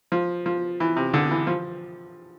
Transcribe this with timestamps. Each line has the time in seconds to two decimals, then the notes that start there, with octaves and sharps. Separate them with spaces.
0.12 F3
0.46 F3
0.80 E3
0.97 C3
1.14 D3
1.31 E3
1.47 F3